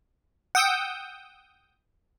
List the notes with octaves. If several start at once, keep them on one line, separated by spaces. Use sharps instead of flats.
F#5 G5 D#6 E6 G6